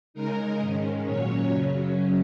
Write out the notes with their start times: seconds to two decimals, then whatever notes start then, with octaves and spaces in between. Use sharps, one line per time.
0.14 C#3 G#3 D#4 A#4
0.60 G#2 D#3 G#3 C#4
1.05 A#2 F#3 C#4 C#5
1.51 F#2 C#3 F#3 C#4